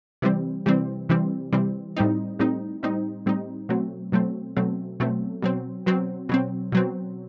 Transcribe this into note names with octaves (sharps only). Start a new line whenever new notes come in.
C3 E3 G3 C4
C3 E3 G3 C4
C3 E3 G3 C4
C3 E3 G3 C4
A2 G3 C4 D#4
A2 G3 C4 D#4
A2 G3 C4 D#4
A2 G3 C4 D#4
B2 F#3 A3 C4
B2 F#3 A3 C4
B2 F#3 A3 C4
B2 F#3 A3 C4
B2 F#3 C4
B2 F#3 C4
B2 F#3 C4
B2 F#3 C4